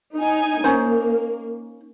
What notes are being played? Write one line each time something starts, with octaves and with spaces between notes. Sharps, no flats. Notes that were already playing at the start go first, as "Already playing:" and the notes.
D#4 G#5
A#3 C#4 D#4 C5